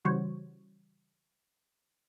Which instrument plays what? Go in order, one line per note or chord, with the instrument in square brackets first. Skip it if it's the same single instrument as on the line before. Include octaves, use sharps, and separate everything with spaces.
[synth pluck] C#3 E3 G3 F#4 C5 C#5